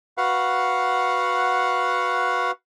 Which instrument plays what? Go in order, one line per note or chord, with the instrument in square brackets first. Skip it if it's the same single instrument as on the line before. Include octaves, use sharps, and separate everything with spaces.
[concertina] F#4 B4 F5 F#5